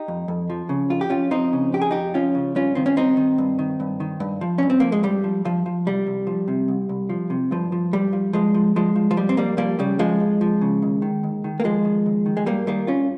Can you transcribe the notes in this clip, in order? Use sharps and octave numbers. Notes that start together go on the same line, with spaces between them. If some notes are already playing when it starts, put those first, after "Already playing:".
Already playing: D#4 G4
F2
F2
F3
C#3
F2 F4
G4
F2 C#4 F4
F3 C4 D#4
C#3
F2 G4
G#4
F2 D#4 G4
F3 C#4 F4
C#3
G2 C#4 F4
D#3 C4
C#4
G2 C4 D#4
D#3
G2
D#3
G2
D#3
G2
F3
G2 C#4
C4
F3 A#3
G#3
G2 G3
F3
G2 F3
F3
C2 G3
C2
F3
C3
C2
C2
F3
C3
G2 F3
F3
G2 G3
F3
G2 F3 G#3
F3
G2 F3 G#3
F3
F3
F2 G3
C4
F2 G3 A#3
F3 G3 A#3
C#3 G3
F2 F3 G#3
F2
F3
C#3
D#2
D#3
D#2
D#3
A#3
D#2 F3 G#3
D#3
D#2
D#3
G#3
G2 G3 A#3
D#3 G3 A#3
G2 C#4 F4